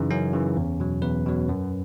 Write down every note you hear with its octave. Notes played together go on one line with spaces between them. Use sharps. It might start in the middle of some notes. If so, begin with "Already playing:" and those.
Already playing: F#2 C#3 E3 D#4
F#2 C#4
C#3 E3
E2
B2 F#3
E2 B4
B2 F#3
F#2